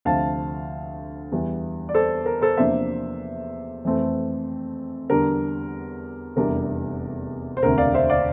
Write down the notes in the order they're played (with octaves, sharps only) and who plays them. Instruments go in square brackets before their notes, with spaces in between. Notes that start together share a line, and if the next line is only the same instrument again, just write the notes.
[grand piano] D2 C3 F3 F5 A5
E2 E3 G3
D5
A4 C5
A#4
A4 C5
E2 C3 F3 A#3 D4 C5 E5
F2 E3 A3 C4
E2 D3 G3 D4 A#4
F1 E2 E3 G3 D4 A#4
C5
E1 D2 C3 A#4
D5 F5
C5 E5
D5 F5